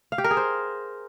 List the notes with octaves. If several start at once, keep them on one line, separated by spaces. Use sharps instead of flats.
F5
G4
A#4
G#4
C5